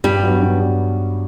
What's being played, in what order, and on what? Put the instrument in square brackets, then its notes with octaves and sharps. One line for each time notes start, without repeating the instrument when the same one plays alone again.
[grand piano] G2 [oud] G3
[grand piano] F#3 B3 D4 F#4
G2